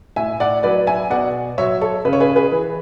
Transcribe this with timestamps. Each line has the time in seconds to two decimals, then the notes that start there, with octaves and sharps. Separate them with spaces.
0.16 A2 E5 G#5
0.40 D5 F#5
0.63 F#3 B4 D5
0.87 E5 G#5
1.10 B2 D5 F#5
1.58 F#3 C#5 E5
1.81 A4 C#5
2.05 C#3 B4
2.13 C#5
2.20 G#4 B4
2.36 G#4 B4
2.52 E3